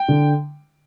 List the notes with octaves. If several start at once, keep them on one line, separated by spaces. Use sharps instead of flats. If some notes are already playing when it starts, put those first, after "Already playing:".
Already playing: G5
D3